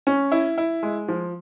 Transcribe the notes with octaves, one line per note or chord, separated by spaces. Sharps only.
C#4
E4
E4
G#3
F3